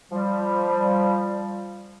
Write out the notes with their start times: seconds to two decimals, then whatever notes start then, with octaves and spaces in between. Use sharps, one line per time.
0.11 F3 G3